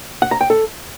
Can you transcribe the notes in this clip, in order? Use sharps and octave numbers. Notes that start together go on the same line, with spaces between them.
F#5
A#5
G5
A4